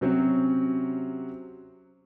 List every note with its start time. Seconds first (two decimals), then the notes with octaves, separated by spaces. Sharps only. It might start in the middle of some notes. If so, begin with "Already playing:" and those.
0.01 C3 F#3 C4 C#4